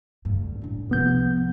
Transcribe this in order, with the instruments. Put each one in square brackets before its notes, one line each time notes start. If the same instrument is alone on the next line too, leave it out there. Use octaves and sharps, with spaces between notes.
[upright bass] G2 D3
A2 D4
[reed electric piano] C2 B3 G6 [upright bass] C3 F3